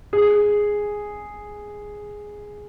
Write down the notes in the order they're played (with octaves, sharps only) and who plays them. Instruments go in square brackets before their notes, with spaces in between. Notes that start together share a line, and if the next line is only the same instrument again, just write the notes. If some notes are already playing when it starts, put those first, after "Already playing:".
[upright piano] G#4